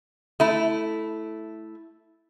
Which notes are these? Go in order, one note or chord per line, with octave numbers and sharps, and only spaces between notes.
A3 E4